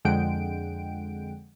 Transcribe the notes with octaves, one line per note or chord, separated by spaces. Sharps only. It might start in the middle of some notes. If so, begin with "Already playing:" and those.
F2 D3 G#3 F#5 G5 D7